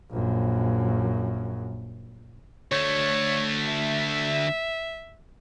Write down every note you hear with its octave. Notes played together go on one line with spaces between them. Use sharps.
A#1 F#2
D2 A3 C#5
E5